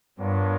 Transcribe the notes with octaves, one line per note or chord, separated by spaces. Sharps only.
G2 B3 D4 F4 A#4 C#5